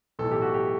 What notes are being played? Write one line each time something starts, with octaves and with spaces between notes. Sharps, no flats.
B1 A2 E3 A4
G4
F#4
G4